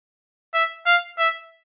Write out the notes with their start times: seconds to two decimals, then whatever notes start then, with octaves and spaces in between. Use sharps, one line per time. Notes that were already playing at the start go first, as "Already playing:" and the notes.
0.54 E5
0.86 F5
1.19 E5